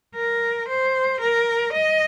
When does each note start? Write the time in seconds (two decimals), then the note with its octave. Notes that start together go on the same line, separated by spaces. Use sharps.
0.15 A#4
0.68 C5
1.20 A#4
1.73 D#5